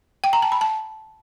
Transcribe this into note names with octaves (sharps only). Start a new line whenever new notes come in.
G5
A#5
A5
B5
A5